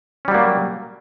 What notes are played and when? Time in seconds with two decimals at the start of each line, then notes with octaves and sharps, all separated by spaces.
0.25 C#4
0.28 G3
0.31 F#3
0.34 A#3